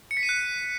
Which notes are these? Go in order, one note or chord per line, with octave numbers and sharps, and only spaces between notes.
C#7
B6
D#7
F#6